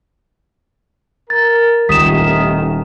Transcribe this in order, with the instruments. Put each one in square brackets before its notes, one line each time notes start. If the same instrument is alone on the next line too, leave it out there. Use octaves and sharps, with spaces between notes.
[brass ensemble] A#4 [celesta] A6
[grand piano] D#1 D#6 [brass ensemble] A2 C3 D#3 [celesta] B6 E7